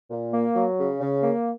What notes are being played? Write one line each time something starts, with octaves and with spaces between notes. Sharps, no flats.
A#2
A#3
F#3
C#3
C#3
A#3